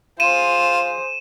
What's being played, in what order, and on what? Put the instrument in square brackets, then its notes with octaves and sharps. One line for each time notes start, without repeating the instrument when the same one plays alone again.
[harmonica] F4 [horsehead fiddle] G#4 C5 [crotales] D#7 E7